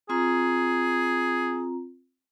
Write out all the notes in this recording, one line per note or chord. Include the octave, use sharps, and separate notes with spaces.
C4 F4 G#4 A#5